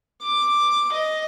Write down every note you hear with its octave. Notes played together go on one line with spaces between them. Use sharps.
D6
D#5